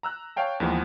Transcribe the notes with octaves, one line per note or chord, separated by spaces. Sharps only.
A#5 E6 F#6
C#5 F5 G5 A5
D#2 E3 F3 G#3 B3